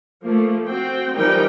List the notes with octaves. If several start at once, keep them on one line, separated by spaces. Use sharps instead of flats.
F3 A3 A#3
C4 F#4 G5
E3 F3 G3 D#4 A#4 G5